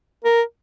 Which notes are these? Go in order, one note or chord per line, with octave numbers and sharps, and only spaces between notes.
A#4